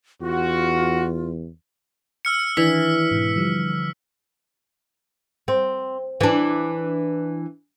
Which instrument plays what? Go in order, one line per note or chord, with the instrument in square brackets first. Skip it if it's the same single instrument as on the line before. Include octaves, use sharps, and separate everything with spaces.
[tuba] E2 [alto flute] F4 [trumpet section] F#4
[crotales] E6 F6 C#7
[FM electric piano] D#3 D4 [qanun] E3 [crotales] E6 B6
[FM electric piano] G#2 B2
D3 F3 G3
[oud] C4
E3 D4